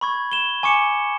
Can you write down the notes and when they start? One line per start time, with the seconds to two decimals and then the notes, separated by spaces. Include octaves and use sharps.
0.01 B5 C#6 G#6
0.32 E7 G7
0.63 G#5 C#6 D6 C#7 E7